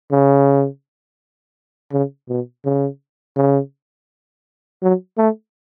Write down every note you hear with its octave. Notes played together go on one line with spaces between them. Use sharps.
C#3
C#3
B2
C#3
C#3
F#3
A3